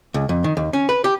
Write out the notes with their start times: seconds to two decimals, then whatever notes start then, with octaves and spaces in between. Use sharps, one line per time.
0.14 C#2
0.29 F2
0.44 D#3
0.57 D#2
0.73 C#4
0.89 B4
1.04 G4